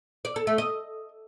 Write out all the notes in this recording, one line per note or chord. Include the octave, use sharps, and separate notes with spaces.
D5
A4
A3
D#5